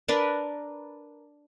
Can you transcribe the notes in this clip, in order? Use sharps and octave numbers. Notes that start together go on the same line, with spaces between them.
D4 A#4 B4 A5